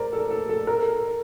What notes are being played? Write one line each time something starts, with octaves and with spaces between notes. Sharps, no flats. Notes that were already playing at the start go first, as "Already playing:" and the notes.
Already playing: A#4 C5 D5
A4
A4
A4
A#4